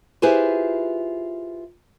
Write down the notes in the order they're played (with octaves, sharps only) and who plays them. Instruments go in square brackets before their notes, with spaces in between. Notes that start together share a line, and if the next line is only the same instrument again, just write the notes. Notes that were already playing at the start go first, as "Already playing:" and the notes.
[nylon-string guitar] E4 F4 G4 G#4 B4 C5